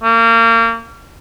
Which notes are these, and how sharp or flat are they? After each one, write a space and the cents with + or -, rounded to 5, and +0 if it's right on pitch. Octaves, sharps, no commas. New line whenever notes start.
A#3 -30